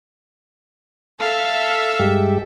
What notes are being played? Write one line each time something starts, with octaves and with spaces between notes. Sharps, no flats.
A4 E5 F5
G2 G#3 G4